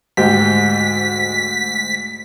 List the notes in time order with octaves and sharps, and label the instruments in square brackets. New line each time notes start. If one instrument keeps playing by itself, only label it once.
[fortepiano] D2 G#2 G4 [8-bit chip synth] B6